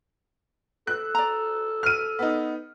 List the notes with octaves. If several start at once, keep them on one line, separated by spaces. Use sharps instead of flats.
A4 F#6
D5 A#5
F6 D#7
B3 D#4